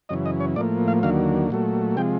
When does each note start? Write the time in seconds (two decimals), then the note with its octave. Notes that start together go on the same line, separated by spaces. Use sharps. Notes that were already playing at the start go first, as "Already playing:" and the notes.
0.09 F#2 C#3 E3 D#5
0.26 D#5
0.40 C#5
0.56 A2 F3 A#3 D5
0.88 F5
1.03 D#2 D3 F#3 A#3 F5
1.50 A#2 F#3 A3
1.97 C3 F3 G#3 G5